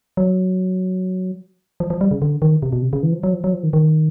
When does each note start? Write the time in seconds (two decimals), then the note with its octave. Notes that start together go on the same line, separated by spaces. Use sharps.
0.17 F#3
1.80 F3
1.90 F3
2.01 G3
2.11 C#3
2.22 D3
2.42 D#3
2.62 C3
2.73 B2
2.82 C3
2.93 C#3
3.03 E3
3.13 F3
3.23 F#3
3.33 F3
3.44 F#3
3.53 F3
3.63 D#3
3.73 D#3